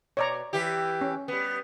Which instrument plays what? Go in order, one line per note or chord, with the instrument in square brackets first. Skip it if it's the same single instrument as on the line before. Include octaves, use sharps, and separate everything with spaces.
[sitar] B2 [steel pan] C#5 D5 A#5
[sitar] E3 G4
[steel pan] C#4
[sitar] G3 B3